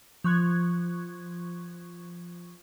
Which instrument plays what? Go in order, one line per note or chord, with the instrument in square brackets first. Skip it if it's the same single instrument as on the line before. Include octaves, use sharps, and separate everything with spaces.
[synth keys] F3 C#6 F#6 G#6